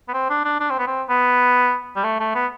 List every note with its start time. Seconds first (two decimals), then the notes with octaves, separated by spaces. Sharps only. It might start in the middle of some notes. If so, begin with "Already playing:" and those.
0.08 B3
0.14 C4
0.30 D4
0.45 D4
0.60 D4
0.70 C4
0.79 B3
0.87 C4
1.09 B3
1.96 G3
2.04 A3
2.19 A3
2.35 B3